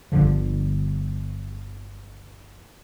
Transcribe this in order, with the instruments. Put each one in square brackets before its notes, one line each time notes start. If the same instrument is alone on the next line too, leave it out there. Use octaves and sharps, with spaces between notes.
[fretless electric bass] G1 G2 D3 F3